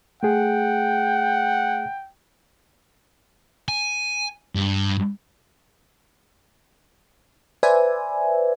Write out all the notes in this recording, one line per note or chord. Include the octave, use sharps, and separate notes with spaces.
A3 G#4 F#5 G5
G#5
G2
B4 C5 D5 E5 G#5